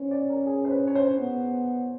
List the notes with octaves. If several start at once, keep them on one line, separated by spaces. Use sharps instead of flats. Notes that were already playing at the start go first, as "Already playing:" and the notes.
Already playing: C#4 C5
D5
A#4
G#4
C5
B4
C#5
C5
B3